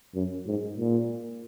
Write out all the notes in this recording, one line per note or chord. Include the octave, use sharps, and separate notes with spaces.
F#2
G#2
A#2